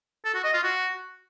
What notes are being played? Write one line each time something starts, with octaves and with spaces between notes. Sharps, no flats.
A4
F#4
D#5
F4
F#4